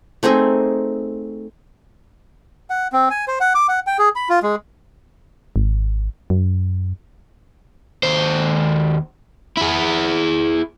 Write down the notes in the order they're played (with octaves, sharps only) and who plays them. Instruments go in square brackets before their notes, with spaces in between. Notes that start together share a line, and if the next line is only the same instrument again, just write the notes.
[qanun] A3 C4 D#4 G#4
[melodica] F#5
C4
G#5
C5
F#5
D6
F#5
G5
G#4
B5
F4
G#3
[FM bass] G#1
F#2
[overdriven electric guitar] D#2 C5
E4 G#4